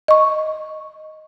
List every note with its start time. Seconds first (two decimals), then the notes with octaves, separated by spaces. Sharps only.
0.08 D#5 C#6